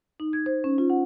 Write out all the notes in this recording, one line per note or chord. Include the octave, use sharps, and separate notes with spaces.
D#4
G#6
C5
C#4
F4
F#5